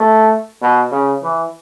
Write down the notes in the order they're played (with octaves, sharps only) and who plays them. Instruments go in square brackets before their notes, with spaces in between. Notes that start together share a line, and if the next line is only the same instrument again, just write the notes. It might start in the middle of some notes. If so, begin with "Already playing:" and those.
Already playing: [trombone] A3
B2
C#3
E3